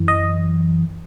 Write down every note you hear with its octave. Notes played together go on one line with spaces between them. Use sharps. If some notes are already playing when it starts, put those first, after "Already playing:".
Already playing: F#2 E3
D#5